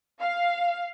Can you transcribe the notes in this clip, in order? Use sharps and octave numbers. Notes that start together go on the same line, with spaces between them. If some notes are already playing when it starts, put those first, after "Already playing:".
F5